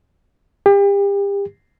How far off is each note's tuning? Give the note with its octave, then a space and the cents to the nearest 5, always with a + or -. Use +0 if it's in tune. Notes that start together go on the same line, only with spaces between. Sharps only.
G4 +35